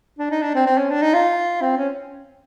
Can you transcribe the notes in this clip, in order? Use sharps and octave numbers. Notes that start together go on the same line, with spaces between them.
D4
D#4
D4
C4
C4
C#4
D4
D#4
F4
C4
C#4